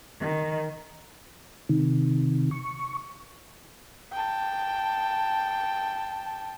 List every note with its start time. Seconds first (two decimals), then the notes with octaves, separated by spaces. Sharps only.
0.19 D#3
1.69 C3 D#3
2.51 C#6
4.13 G5 A5